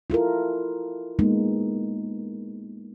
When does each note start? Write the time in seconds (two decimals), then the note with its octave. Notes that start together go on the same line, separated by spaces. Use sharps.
0.10 E4 F4 A4 A#4
1.19 G#3 A#3 B3 D#4